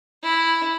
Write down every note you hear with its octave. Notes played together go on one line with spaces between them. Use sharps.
E4